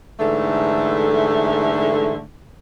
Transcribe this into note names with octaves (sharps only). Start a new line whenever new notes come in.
G#2 D3 E3 A3